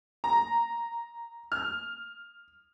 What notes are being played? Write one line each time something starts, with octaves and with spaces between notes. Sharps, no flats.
A#5
F6